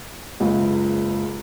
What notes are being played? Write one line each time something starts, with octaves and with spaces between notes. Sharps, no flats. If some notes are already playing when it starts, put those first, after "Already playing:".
F#1 C#2